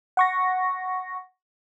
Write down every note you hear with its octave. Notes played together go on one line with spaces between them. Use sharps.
F#5 C#6 A#6